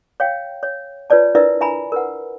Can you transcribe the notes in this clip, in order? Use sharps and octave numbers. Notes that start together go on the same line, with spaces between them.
C#5 F5 G5
C#5
F4 B4 C#5 D5 A5
D4 E4 A#4 B4 D5 E5
E5 G#5 A#5 B5
A#4 B4 F#5